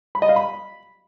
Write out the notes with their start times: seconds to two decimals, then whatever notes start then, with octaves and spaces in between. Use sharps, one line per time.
0.15 B5
0.22 D#5
0.29 F5
0.36 B5